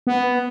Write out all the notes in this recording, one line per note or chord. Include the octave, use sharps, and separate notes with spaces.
B3